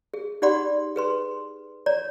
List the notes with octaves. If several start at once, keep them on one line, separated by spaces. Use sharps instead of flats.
G#4
D#4 G4 D5 F#5 B5 C6
G#4 B4 C6
C#5 D5 A#5